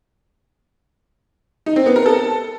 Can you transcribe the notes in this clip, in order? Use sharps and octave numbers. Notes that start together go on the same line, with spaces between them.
D#4
C4
B3
A#4
A4